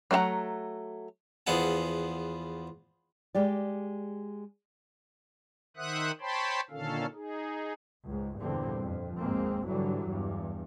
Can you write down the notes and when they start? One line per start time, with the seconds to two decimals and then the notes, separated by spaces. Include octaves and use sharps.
0.11 F#3 A3 G#4 F#5 A#5
1.47 E2 F3 B3 G#4 F#5 A5
3.35 G#3 G4 D5
5.77 D#3 C5 E5 F#5 D#6 F#6
6.20 C5 C#5 G5 A5 B5 C6
6.70 A#2 D3 D#3 C#4 A4 F5
7.14 D#4 G#4
8.06 C#2 G#2
8.40 E2 G2 A#2 D3 C4
8.84 F2
9.20 G#1 D#2 G#2 G#3 A#3 C4
9.66 G#2 D3 E3 F#3 G3
10.06 E2 G2